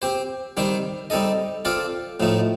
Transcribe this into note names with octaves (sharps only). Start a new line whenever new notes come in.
C4 G4 C5
D#3 G3 C4 G4 C5
G3 C4 D#4 A4 D#5
C4 F4 A4 D5 F5
A2 F3 A3 D#4